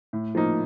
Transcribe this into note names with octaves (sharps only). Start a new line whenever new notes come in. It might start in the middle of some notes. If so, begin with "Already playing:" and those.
A2
F3 A#3 D#4